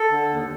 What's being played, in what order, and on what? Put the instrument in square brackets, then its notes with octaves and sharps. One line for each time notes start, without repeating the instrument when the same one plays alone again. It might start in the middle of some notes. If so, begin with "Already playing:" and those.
Already playing: [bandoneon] A4
D3
D#2